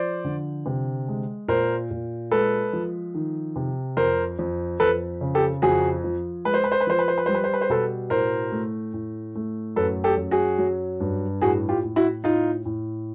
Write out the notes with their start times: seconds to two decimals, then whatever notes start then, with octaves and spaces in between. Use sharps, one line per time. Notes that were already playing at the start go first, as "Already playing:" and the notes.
Already playing: F3 C5 D5
0.25 D3
0.66 C3
1.08 G#3
1.48 A#2 A#4 C5
1.91 A#2
2.31 G#3 A4 B4
2.73 F3
3.14 D#3
3.56 C3
3.97 F2 A#4 C5
4.39 F2
4.80 F2 A4 B4
5.21 C#3
5.35 G4 A4
5.62 F2 F#4 G#4
6.04 F3
6.45 G#3 B4
6.54 C5
6.64 B4
6.72 C5
6.81 B4
6.87 F3 C5
6.99 B4
7.08 C5
7.18 B4
7.26 G3 C5
7.35 B4
7.44 C5
7.54 B4
7.61 C5
7.69 B2 A4 B4
8.10 A2 A#4 C5
8.52 A3
8.94 A2
9.35 A3
9.76 F#2 A4 B4
10.04 G4 A4
10.17 F#2
10.31 F#4 G#4
10.58 F#3
11.00 G2
11.41 A2 F#4 G#4
11.69 F4 G4
11.84 A2
11.96 E4 F#4
12.24 A2 D#4 F4
12.65 A2